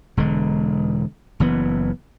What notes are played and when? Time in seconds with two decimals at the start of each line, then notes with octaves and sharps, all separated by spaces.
0.17 E1 D3 G#3
1.40 F#1 E3 B3